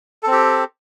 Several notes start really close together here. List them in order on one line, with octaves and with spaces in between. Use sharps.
A4 C4 G4